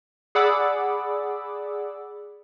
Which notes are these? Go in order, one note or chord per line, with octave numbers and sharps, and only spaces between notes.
G#4 D5 F#5 B5 D6 E6